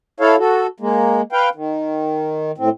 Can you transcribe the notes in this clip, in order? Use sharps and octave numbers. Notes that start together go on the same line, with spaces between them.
E4 A4 C#5 F5
F#4 A4
G#3 A#3
B4 F5 G5
D#3
A2 C4